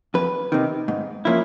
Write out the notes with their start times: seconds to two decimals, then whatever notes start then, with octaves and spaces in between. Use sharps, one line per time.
0.14 F2 B4
0.52 C3 D#3
0.88 G#2
1.25 F3 A#3 C#4 E4